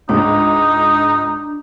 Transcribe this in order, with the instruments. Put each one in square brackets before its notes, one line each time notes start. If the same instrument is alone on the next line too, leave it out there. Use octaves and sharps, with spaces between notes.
[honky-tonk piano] C#2 G#2 [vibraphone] D4 [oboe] D#4